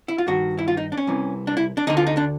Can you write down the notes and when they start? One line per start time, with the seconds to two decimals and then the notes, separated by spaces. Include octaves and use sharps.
0.08 E4
0.18 F4
0.27 G2 D#3 F#4
0.59 E4
0.68 F4
0.77 D#4
0.92 D4
0.97 C#4
1.07 C2 C3 E3
1.47 D4
1.57 E4
1.77 D4
1.87 D2 D3 D#4
1.97 F4
2.07 D#4
2.17 D4